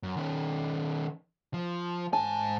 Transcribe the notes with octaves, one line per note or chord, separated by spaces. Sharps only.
F#2
D#3 C#4
F3
G#2 G#5 A5